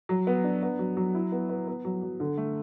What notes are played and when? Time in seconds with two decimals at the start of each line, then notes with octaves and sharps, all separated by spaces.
0.09 F#3
0.27 B3
0.44 D4
0.63 B3
0.79 F#3
0.97 F#3
1.14 E4
1.32 B3
1.49 B3
1.68 B3
1.85 F#3
2.02 F#3
2.20 D3
2.37 A3